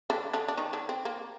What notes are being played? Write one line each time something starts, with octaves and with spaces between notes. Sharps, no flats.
D3 D4
D3 D4
D4
D#3 D#4
D3 D4
C4
A#3